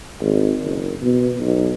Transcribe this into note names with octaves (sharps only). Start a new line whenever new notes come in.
G#1
F#1
B2
B1